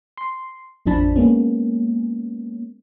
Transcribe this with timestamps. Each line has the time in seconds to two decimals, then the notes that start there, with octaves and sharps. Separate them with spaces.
0.17 C6
0.86 A1 F2 F3 D4 A5 B5
1.16 G#3 A#3 B3 C#4